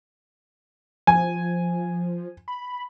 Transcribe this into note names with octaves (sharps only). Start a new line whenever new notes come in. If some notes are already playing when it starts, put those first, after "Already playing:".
F3 G#5
B5